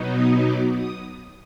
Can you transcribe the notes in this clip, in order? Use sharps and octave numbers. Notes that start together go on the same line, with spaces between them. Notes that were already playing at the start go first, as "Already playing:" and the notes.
Already playing: B2 F#3 B3 D#4
D#6
D6
D#6